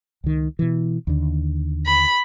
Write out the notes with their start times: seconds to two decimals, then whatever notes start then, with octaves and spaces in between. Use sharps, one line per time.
0.24 C#2 D#3
0.59 B2 E3
1.07 D#2 D3
1.86 B5